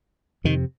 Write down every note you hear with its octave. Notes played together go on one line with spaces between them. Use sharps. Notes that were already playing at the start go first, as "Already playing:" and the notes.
F2 C3 D#3